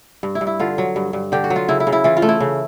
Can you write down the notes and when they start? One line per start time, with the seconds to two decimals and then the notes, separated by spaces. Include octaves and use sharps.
0.23 G2
0.35 E4
0.41 G2
0.47 E4
0.60 D3 F4
0.78 F#3
0.96 G2
1.13 G2
1.32 D3 G4
1.44 F#4
1.50 F#3
1.56 F4
1.68 C#3 E4
1.80 E4
1.87 C#3
1.93 E4
2.04 E3 F4
2.17 F4
2.22 A3
2.29 E4
2.40 C#3